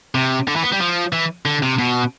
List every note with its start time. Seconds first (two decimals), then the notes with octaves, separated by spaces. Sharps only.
0.15 C3
0.47 D3
0.56 E3
0.63 B3
0.72 G3
0.80 F3
1.13 E3
1.46 D3
1.63 C3
1.78 B2